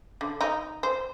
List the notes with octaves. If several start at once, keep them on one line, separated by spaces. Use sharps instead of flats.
D3
D#4
C5